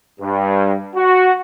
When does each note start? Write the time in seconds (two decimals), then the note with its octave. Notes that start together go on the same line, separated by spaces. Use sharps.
0.20 G2
0.95 F#4